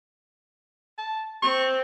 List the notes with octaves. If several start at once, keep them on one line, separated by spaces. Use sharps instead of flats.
A5
C4 C#6